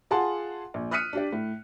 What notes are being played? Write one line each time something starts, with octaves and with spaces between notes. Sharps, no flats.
F4 G#4 F#5 A5 C6
A#1
D#6 F6 F#6 B6 C#7 D#7
D4 G4 D5
A2